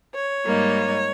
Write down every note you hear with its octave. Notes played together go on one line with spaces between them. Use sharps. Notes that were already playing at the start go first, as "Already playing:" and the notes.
C#5
G#2 G3 A#3 D#4